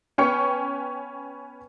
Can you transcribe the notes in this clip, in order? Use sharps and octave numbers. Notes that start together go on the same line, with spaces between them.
B3 C#4 G5 C#6 F6 C#7